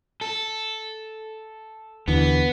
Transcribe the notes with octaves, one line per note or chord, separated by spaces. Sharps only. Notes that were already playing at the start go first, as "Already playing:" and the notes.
A4
D#2 D3 E3 B3